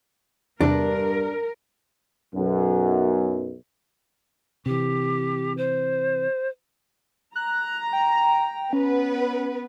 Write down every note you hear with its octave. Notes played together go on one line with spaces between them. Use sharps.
E2 G2 C3 D4 A#4
B1 F#2
C3 E3 G4
C5
A#5 F#6
G5
B3 C#4 B4